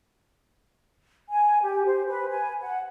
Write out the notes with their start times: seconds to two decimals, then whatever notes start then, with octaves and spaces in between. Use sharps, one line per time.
1.30 G#5
1.62 G4
1.86 C5
2.08 B4
2.30 G#5
2.61 F#5